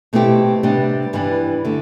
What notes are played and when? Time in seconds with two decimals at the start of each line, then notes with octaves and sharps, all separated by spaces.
0.13 B2 A3 C4 E4 G4
0.63 C3 G3 B3 D4
1.13 G2 E3 G3 D4
1.65 D3 A3